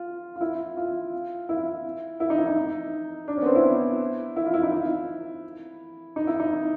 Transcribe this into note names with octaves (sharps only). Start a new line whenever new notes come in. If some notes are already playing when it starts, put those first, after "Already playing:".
Already playing: F4
F4
E4
F4
E4
E4
D#4
E4
D#4
D4
C#4
B3
C4
E4
E4
F4
E4
D#4
E4
D#4
E4
D#4